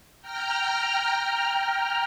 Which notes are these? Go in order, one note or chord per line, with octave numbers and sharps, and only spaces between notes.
G5 A#5 F6